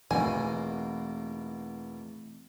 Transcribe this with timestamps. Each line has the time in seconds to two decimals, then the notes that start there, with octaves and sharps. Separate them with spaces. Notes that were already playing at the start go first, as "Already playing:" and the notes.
0.11 E2 B2 E3 A3 A#3 C4 G#5